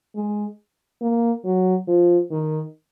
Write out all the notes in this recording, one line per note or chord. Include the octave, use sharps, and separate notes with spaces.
G#3
A#3
F#3
F3
D#3